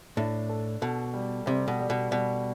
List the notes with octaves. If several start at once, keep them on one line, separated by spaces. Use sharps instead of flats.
A2 D4
A4
B2 A4
G3
C3 G3
B2
G3
B2
B2 G3